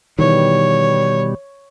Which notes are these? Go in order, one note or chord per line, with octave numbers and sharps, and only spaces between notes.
B2 D#3 E3 G3 C#5